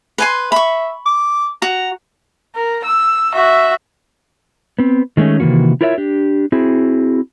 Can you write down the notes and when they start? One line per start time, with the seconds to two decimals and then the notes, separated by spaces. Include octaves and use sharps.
0.18 B4 G#5 C6
0.52 E5 B5 C#6
1.06 D6
1.62 F#4 A#5
2.56 A#4
2.85 E6
3.35 F#4 E5
4.79 B3 C4
5.17 D#3 G#3 A3 C4 C#4
5.40 C3 D#3 E3 A#3 F#4
5.81 E4 F4 A#4 C#5 D5 E5
5.98 D4 G4
6.52 C4 E4 F#4 G#4